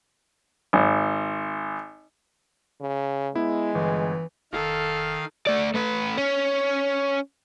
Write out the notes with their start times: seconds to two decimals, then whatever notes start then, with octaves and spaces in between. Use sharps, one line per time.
0.73 G#1
2.80 C#3
3.35 G#3 B3 E4
3.75 G1 E3
4.53 F1 D#3 A4 F5
5.47 A3 D5
5.74 A3 B4
6.17 C#4